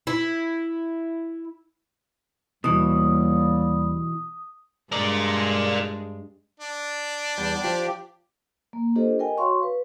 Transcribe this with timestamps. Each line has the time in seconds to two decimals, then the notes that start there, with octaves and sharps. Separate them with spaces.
0.07 E4
2.64 D#2 B2 E3 G3 D#6
4.92 G2 G#3 D4 A#4 D5
6.60 D4
7.38 E2 G3 G6
7.64 F3 G4
8.73 A#3
8.96 D4 F4 G4 A4 C5 D#5
9.19 A#4 D#5 G5 G#5
9.38 F#4 C#5 F5 C6 C#6
9.63 B4